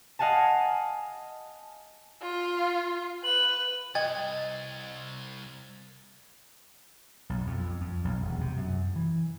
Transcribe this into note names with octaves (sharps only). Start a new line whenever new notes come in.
D#5 F5 F#5 G#5 A5
F4
B4 F#7
C2 D#5 G5 G#6 A6
B1
F2
F2
B1
E1
C3
F#2
E3